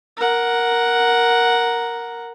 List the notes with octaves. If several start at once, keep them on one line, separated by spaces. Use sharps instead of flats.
A#4 F#5